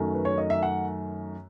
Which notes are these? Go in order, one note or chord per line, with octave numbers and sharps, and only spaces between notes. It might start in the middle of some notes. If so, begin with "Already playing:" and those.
Already playing: F#2 D#3 F#3 A3
B4
C#5
D#5
E5
F#5